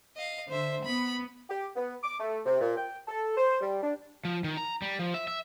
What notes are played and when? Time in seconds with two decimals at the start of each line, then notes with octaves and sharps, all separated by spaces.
0.16 D#5 F5
0.49 D3 C5 E5
0.84 B3 B5
1.50 G4
1.76 B3
2.03 D6
2.20 A3
2.46 C3
2.61 A#2
2.77 G5
3.08 A4
3.37 C5
3.61 G3
3.83 D4
4.25 F3
4.44 D#3
4.57 A#5
4.82 G3
4.99 F3
5.14 E5
5.27 E5